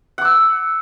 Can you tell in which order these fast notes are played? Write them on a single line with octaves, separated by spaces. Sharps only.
F#5 D6 E6